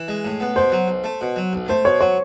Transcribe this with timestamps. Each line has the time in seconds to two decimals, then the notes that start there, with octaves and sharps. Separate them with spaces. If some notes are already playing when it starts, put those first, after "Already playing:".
Already playing: E3
0.08 G#3
0.25 A2
0.40 B3
0.56 B2 C5
0.72 F#3
0.88 B1
1.04 A3
1.21 B2
1.36 F#3
1.53 B1
1.68 A3 C5
1.85 B2 C#5
2.01 F#3 C#5